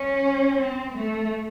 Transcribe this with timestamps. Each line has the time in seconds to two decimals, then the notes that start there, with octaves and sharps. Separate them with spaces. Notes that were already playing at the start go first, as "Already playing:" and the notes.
Already playing: C#4
0.61 C4
0.96 A3